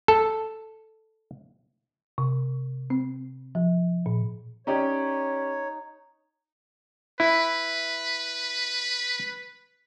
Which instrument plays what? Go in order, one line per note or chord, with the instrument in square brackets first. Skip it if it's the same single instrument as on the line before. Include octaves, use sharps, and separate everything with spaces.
[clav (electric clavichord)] A4
[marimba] C3
C4
F3
A#2
[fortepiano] C#4 G4 D5 [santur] D#4 [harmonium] C#5
[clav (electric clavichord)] E4 [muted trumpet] B4